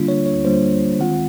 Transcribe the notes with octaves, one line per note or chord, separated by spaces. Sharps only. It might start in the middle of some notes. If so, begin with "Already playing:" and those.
Already playing: D3 G3 A#3 D4 F4
C#5
C#5
D3 G3 A#3 D4 F4 C5
D#3 G#3 C4 F4 F#5